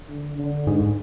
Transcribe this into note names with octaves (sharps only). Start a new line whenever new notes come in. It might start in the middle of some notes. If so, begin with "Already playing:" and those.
D3
D3
G#2